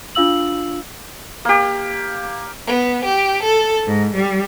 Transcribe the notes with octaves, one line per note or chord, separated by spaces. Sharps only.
D4 F4 F5 E6 F#7
A#3 G4
B3
G4
A4
G#2
G3